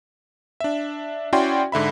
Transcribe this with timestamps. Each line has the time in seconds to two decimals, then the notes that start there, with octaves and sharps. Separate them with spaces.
0.60 D4 E5
1.33 C#4 E4 F#4 D5 G5 C6
1.72 G#2 D3 E5 B5